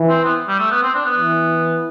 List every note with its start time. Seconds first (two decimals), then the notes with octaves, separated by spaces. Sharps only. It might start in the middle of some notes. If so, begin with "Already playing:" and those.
Already playing: E3
0.09 C4
0.25 B3
0.48 G3
0.59 A3
0.71 B3
0.83 C4
0.95 D4
1.05 B3
1.18 E3